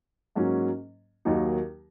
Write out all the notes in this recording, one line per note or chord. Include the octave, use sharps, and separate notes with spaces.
G#2 F#3 A#3 C#4
D#2 D#3 F#3 A#3 D#4